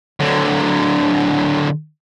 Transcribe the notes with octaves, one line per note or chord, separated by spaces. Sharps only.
D3 F#3